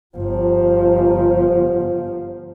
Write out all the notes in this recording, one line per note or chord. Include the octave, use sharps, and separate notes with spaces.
G1 F3